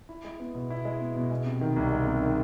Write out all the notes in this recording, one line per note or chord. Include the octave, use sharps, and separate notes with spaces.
E4
G#3
B3
B2
E4
G#3
B3
B2
G#3
C3
D#3
C2
G#3
C3
D#3